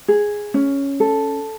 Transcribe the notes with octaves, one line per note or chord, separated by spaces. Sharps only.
G#4
C#4
A4